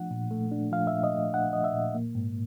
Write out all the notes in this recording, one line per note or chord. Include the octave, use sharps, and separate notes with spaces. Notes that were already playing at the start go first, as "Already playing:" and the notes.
Already playing: F3 A3 D4 F#5
A#2
A3
D4
F3 F5
E5
A#2
D#5
A3
D4 F#5
F3 D#5
E5
A#2
A#3
G#2